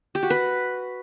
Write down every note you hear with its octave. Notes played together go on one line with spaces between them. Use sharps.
G4
F#4
B4